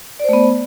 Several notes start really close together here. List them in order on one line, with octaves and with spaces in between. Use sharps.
D5 C5 A3 B3